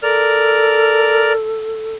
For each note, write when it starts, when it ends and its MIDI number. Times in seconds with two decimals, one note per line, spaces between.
0.03 1.97 69
0.03 1.33 70
0.03 1.33 74
0.03 1.33 89